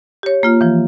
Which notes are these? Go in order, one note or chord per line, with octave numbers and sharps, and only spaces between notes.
G4 C#5
A#3 F4 F6
E3 F3